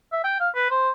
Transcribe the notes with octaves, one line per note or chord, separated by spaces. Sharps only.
E5
G5
F5
B4
C5